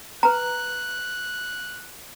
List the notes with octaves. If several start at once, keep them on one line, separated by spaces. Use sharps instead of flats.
B4 A#5 F#6